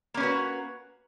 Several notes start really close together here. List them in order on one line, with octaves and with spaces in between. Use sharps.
A#3 C#4 B4 F#4